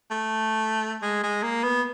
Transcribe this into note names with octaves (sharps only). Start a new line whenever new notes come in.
A3
G#3
G#3
A#3
B3